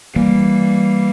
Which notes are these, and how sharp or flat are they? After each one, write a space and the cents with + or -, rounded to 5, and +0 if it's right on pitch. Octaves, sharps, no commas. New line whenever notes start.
E3 +0 G3 +0 A#3 +0